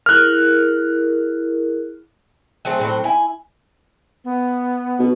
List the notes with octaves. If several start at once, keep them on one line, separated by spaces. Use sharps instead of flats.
E4 G#4 A#4 F6 F#6
F#3 A3 C4 G#4
A2 F#3 C4
E4 G#5
B3
B2